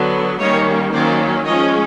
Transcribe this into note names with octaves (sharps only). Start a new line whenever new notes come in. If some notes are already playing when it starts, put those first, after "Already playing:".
Already playing: D3 F#3 B3
D#3 G3 A#3 C#4 C#5 D#5
D#3 F#3 A#3 C#4 C5 D5
F3 G#3 C#4 C#5 D#5